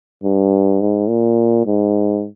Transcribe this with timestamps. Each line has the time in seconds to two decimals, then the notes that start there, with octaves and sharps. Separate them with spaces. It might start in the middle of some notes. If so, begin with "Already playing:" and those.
0.24 G2
0.81 G#2
1.09 A#2
1.66 G#2